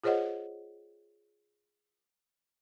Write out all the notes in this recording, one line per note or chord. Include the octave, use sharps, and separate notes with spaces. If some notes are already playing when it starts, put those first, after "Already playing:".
F4 G#4 C5 C#5 D#5 F#5